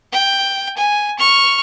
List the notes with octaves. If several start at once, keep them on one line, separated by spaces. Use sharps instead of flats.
G5
G#5
C#6 F6